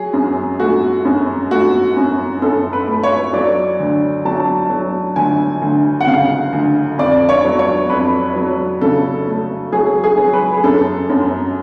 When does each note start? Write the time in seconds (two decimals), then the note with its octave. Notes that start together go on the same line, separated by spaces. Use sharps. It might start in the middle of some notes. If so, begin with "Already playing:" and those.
Already playing: F#3 G#4
0.13 F#2
0.60 A3 F#4
1.05 F#2
1.51 A3 F#4
1.96 F#2
2.42 F#2 A4
2.73 B4
2.88 A3
3.03 C#5
3.33 F#3 D5
3.80 D2
4.25 F#3 A5
4.70 F#3
5.16 D2 G#5
5.62 D2
6.01 F#5
6.07 C#3 F5
6.53 D2
6.98 F2 D5
7.29 C#5
7.45 F#3
7.59 C#5
7.90 F2 B4
8.36 F#3
8.81 C#3 A4
9.27 A3
9.73 F#3 G#4
10.04 G#4
10.18 F#3
10.33 B4
10.57 G#4
10.64 F#2 A4
11.10 F#2